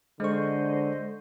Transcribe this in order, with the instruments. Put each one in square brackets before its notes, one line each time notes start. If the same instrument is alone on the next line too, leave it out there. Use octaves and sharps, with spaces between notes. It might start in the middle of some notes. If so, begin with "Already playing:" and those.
[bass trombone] D3 [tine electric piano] G#3 C#6 [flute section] C5 D#5